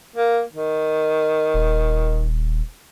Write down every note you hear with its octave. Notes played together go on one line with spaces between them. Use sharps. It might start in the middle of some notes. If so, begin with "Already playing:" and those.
A#3
D#3
D#1